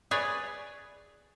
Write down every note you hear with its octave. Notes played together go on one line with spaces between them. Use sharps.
G#4 B4 C#5 D5